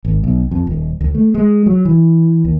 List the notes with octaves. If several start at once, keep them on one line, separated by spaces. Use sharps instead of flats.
G#1
B1
F2
D#1
D2
A3
G#3
F#3
E3
D#2